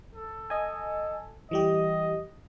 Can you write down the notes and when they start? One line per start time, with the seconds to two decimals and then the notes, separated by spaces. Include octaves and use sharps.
0.15 A4
0.50 D#5 G#5
1.51 E3 G3 G4 D#5